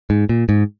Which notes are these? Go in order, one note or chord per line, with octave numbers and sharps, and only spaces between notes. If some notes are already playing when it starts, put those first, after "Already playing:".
G#2
A#2
G#2